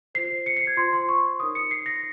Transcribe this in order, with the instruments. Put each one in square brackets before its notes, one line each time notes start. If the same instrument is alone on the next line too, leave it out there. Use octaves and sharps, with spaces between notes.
[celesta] F4 C5 C7
C#7
C7
G#6
F4 C5 C6
C6
C#6
D#4 A#4 C#5 D#6
C#7
C7
A#6